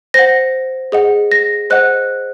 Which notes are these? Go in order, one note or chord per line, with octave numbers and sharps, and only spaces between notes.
C5 F#5 A#6
G#4 D#5 F#5
A#6
C5 D#5 F#5 F#6